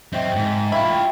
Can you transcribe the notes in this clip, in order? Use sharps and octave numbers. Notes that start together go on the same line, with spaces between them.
F#3 C4 D#5 E5 G5
G#2
E4 F4 F5 G5 B5 C#6
G5